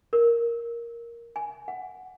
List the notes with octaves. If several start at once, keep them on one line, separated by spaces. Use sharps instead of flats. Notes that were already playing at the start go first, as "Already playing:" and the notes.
A#4
G#5
F#5